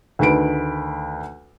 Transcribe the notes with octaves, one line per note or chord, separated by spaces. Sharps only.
D2 D#3 B4 B5 D7